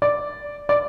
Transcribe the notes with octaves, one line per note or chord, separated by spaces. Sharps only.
D5
D5